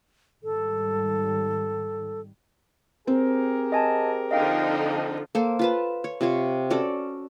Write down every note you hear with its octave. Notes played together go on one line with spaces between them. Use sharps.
G#1 D#3 G3 A4
C4 G4 G#4 A#4
D#5 G#5 A5
D3 F3 D#4 D#5 F5 G5
A#3 A4 C5
F4 B4 A5
C#5
C3 F4 C#5
C#4 F#4 A4 D5